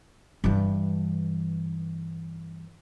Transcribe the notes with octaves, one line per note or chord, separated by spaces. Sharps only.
G2 E3